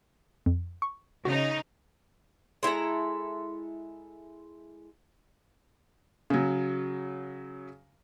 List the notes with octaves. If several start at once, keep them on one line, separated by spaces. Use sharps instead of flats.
F2
C#6
C#3 D#4 F#4
G#3 E4 A4 A#5
C#3 F#3